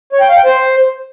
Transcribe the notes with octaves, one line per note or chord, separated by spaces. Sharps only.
C#5
G5
F5
G5
C5